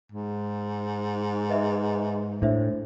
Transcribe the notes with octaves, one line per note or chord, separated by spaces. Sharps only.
G#2
B4 D#5 E5
A2 D4 C5 E5